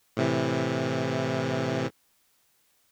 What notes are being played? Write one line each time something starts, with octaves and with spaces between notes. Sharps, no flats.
A2 C3 E3